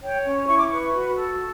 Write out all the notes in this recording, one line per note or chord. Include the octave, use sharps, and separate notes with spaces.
C#5 G5
C#4
E4 C#6
D6
B4 C#6
F#4
A4